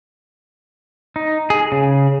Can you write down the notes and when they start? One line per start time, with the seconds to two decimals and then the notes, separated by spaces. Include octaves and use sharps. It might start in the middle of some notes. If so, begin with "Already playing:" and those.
1.16 D#4
1.50 G#4
1.72 C#3